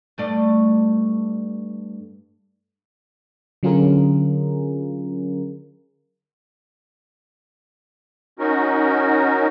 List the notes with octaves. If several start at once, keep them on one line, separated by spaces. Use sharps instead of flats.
G2 A3 D5
D3 F#3 C#4 F4 G#4 A#4
C#4 D#4 F#4 A#4